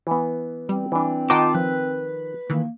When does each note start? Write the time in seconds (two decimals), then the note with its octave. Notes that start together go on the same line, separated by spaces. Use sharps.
0.07 E3 B3
0.69 G3 C4
0.92 E3 D4
1.30 D#3 F4 D#5 F#5 G5 A5 D6
1.55 F3 B4
2.50 D#3 E3 A#3